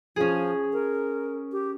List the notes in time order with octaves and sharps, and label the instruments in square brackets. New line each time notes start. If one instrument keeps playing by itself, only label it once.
[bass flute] F3 [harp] C#4 G#4
[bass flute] A#4
G4